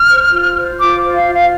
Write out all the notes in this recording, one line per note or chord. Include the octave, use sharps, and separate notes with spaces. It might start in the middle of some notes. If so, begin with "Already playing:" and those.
Already playing: F6
C5
F4
C5
F4 D6
C5
F5
F4
F5